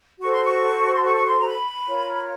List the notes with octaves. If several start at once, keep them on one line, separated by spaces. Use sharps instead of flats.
F#4 A4 C5 C#6
C6
C#6
C6
C#6
C#6
C6
A#5
B5
F4 A#4 C#5